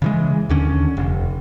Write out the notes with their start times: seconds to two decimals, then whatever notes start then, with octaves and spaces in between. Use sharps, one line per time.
0.02 C#3 E3 G#3
0.49 D#2 D3 C#4
0.97 F1